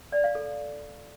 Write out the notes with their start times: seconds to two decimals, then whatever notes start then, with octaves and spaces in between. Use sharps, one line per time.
0.12 D5
0.24 F5
0.35 A4